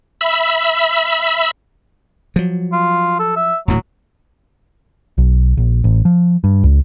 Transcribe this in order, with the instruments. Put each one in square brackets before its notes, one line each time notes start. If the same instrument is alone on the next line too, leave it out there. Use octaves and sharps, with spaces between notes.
[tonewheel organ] E5 B5 E6
[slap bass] F3 F#3
[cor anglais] F4
A4
E5
[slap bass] D#1 D2 A2 [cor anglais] F#3
[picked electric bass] B1
A#1
A1
F3
G2
C#2